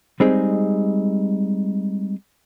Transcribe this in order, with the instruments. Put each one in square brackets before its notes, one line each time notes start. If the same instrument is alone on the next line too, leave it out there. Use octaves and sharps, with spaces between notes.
[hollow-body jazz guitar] G3 G#3 C4 D#4 G#4